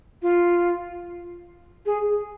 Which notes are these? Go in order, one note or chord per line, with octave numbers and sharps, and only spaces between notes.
F4
G#4